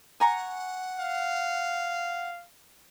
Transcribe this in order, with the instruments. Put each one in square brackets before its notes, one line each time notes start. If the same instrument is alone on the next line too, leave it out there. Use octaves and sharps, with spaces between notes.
[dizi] F#5 [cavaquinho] G#5 A#5 C#6
[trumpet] F5